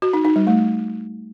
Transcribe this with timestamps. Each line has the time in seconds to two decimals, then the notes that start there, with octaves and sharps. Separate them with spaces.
0.02 F#4
0.13 D#4
0.25 D#4
0.36 G3
0.47 A3